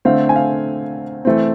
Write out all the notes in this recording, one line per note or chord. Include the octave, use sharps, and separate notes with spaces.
D3 A3 C4 F5
G#5
F5
E3 A3 C4